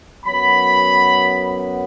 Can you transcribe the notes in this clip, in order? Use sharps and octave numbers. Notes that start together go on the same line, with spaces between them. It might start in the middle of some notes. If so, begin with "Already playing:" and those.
F#2 F#3 B3 B5